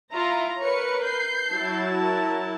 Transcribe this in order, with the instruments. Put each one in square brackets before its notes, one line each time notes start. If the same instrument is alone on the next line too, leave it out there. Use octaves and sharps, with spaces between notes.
[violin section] E4 F4 [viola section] A#5
[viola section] A#4 B4 [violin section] C#5 C#7
[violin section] G6 C7
[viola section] F#3 E4 A5
[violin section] A#4